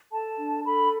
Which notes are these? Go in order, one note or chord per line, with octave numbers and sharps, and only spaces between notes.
A4 A5
D4
A4 B5